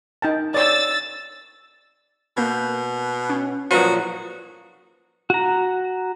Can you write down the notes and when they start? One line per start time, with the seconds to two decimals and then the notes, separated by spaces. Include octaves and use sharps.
0.22 D#4 G5 A5
0.54 C#5 D5 E6 A6
2.37 B2 A#3 A#4 G6
3.30 C#4
3.71 A#2 F3 F#3 F#4 B4 A#5 D#6
5.30 F#4 A#5